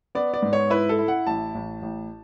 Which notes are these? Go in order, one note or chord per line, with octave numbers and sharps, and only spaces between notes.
B3 D5
D5
G#2
C#5
E4 B4
A4
E4
F#5
A1 A5
A1
A1